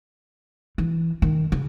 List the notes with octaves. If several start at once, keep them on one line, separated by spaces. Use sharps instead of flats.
E3
D#3
C#3